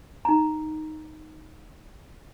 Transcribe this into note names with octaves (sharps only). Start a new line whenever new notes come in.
D#4 A#5